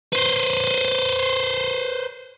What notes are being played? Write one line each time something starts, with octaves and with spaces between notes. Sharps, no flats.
B4 C5